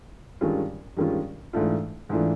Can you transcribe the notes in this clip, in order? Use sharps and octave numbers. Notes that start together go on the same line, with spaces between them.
G2 D#3 G#3 C#4 F4
G2 D#3 G#3 C#4 F4
G#2 E3 A3 D4 F4
G#2 E3 A3 D4 F4